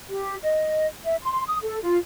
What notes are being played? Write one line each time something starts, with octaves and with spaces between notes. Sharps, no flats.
G4
D#5
E5
C6
D#6
A4
F4